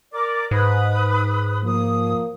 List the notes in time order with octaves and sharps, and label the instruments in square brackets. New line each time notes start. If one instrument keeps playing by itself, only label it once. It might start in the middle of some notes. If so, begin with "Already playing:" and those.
[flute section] A#4 D5 D6
[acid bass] G#2 [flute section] B4 B5 D#6
[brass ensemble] F3 A#3 [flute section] D#6